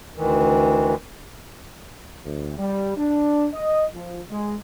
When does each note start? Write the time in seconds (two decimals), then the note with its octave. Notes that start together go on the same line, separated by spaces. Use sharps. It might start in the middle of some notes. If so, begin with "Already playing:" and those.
0.16 D2 D#3 E3
2.24 D2
2.58 G3
2.97 D4
3.53 D#5
3.94 F3
4.31 G#3